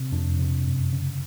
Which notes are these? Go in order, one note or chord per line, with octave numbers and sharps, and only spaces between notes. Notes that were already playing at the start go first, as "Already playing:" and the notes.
Already playing: C3
F2 D4
C3
F#2
C#3